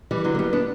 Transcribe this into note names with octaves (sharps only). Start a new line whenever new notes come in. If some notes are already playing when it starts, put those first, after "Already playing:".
E3 G3
D3 F#3
A#3
G3 B3
B3 D4